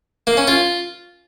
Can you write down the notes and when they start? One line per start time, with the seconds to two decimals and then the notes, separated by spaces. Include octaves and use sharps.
0.27 A#3
0.37 C#4
0.48 F4